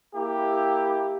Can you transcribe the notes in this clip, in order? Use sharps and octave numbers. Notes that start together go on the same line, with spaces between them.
A#3 E4 G4